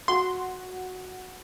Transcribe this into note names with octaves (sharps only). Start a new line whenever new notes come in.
F#4 C6